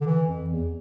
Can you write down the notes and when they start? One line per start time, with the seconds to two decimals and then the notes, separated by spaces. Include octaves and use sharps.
0.01 D3
0.07 E3
0.28 F2
0.50 E2